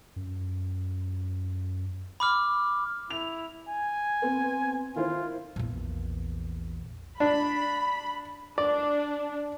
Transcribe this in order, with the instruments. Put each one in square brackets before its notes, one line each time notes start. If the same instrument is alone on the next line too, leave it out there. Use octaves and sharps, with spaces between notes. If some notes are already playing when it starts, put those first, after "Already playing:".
[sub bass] F#2
[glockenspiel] B5 D6 F6
[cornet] E4 [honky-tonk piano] F7
[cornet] G#5
[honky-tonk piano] B3 C4
[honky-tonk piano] D#3 E4 C5 [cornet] F4
[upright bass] A#1 E2
[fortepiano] D4 [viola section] B5
[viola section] D4 [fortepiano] D5